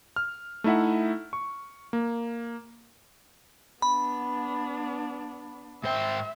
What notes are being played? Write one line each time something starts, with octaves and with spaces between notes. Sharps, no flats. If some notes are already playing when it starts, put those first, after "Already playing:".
F6
A3 D#4 E4 E5 F#5
C#6
A#3
B3 D4 B5
G#2 C5 E5 G5